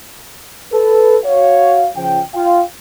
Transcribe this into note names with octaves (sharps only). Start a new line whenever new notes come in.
A4 B4
F#4 C#5 F5
C#3 F3 G5
F4 F5 G5